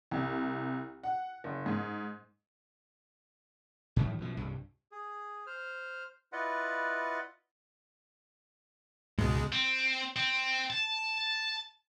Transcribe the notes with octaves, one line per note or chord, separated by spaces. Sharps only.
C2
F#5
F#1
G#2
F#2 A2 D#3 E3
F#2 B2 F3
C2 G2
G#4
C5 F6
E4 F4 B4 D5 D#5 F#5
C#2 G#2 B2 G#3
C4
C4
A5